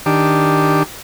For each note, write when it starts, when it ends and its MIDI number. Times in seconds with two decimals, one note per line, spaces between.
0.06 0.83 51
0.06 0.83 62
0.06 0.83 67